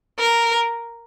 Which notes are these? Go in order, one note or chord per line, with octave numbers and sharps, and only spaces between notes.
A#4